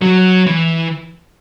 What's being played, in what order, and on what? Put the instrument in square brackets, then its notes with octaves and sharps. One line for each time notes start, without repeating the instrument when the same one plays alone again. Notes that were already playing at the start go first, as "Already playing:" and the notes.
[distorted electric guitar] F#3
E3